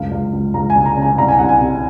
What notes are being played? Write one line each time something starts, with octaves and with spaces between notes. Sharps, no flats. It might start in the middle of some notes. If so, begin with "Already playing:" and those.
Already playing: C#2 F#2 F5
C#2 F5
C#2
C#2 A#5
G#5
C#2
A#5
C#3
G#5
C2 A#5
G#5
C2 F#5
G#5
C3